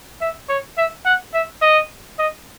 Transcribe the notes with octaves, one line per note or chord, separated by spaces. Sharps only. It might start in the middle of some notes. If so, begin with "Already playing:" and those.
E5
C#5
E5
F#5
E5
D#5
D#5